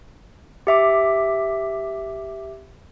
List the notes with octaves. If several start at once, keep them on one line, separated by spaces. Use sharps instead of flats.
G4 E5 D6